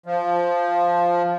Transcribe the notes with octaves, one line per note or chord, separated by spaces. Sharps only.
F3